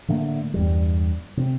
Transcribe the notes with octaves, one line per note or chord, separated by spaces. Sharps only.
A2 D3 A3 A#3
E2 G2 G3
C3 C4